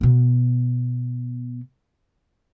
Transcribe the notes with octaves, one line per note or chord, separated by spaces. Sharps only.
B2 B3